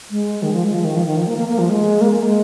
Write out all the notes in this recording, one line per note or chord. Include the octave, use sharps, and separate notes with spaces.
G#3
D#3
F3
G#3
F3
D#3
F3
D#3
F3
A#3
A#3
A#3
F3
G#3
A#3
A#3
G#3